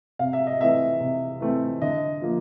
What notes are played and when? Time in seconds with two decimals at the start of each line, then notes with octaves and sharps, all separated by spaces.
0.19 C3 F5
0.33 E5
0.47 D#5
0.60 E3 A3 C4 E5
1.00 C3
1.41 E3 A3 C4
1.81 D3 D#5
2.22 F3 A#3